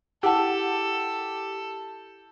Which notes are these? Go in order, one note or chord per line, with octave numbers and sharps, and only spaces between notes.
E4 G4 A4 F#5 A5